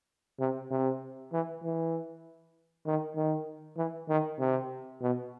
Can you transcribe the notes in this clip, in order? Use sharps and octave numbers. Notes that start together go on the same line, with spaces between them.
C3
C3
E3
E3
D#3
D#3
E3
D#3
C3
B2